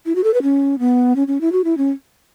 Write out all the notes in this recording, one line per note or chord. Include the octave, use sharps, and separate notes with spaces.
E4
F#4
A4
B4
C#4
B3
C#4
C#4
E4
F#4
E4
C#4